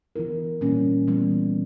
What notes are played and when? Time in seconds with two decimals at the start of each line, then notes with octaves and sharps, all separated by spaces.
0.16 E3 B3 E4 A#4
0.61 A#2 G3 A#3 C#4
1.08 E3 G3 B3